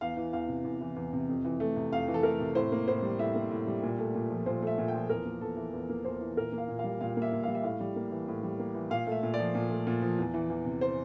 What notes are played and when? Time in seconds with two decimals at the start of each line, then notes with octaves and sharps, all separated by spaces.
0.01 E2 F5
0.17 E3
0.33 E2 F5
0.48 C3
0.64 E2
0.81 E3
0.96 E2
1.13 C3
1.29 F2
1.45 E3
1.60 A3
1.76 C3
1.92 F2 F5
2.08 E3
2.14 A4
2.23 A3 A#4
2.40 C3
2.55 A2 C5
2.72 A#3
2.87 A2 C5
3.03 G3
3.19 A2 E5
3.36 A#3
3.51 A2
3.67 G3
3.83 A#2
3.98 A3
4.15 A#2
4.30 F3
4.46 A#2 C5
4.62 A3 E5
4.78 A#2
4.88 G5
4.94 F3
5.09 E2 A#4
5.26 A#3
5.41 E2 A4
5.57 E3
5.73 E2
5.89 A#3
6.05 E2 C5
6.21 E3
6.37 A#2 A#4
6.52 A#3
6.58 F5
6.68 A#2
6.79 F5
6.84 G3
7.01 A#2 F5
7.17 A#3
7.22 E5
7.32 A#2
7.43 G3 F5
7.55 E5
7.63 A2 F5
7.80 G3
7.96 A#3
8.12 E3
8.28 A2
8.43 G3
8.59 A#3
8.74 E3
8.90 A#2 F5
9.07 A3
9.12 E5
9.23 A#2
9.34 D5
9.39 F3
9.55 A#2
9.70 A3
9.87 A#2
10.02 F3
10.18 E2
10.34 E3
10.50 E2
10.65 C3
10.81 C5